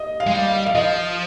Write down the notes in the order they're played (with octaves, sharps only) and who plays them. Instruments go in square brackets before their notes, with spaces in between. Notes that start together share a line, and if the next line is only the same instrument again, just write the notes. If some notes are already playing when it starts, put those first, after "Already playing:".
Already playing: [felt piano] D#5
F5
[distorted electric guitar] G#3
G3
[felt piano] F5
F5
[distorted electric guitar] F3 [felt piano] D#5